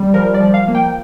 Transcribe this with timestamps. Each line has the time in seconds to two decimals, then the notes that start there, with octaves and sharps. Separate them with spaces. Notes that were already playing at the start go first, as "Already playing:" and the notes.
Already playing: G3
0.14 F3 A#4
0.34 D5
0.40 F3
0.54 F5
0.68 A#3
0.75 G5